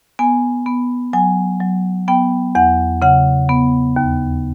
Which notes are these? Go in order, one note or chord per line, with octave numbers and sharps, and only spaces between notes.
B3 G#5
B3
F#3 G#5
F#3
B3 G5
E2 F#5
C#3 F#5
B3
D#2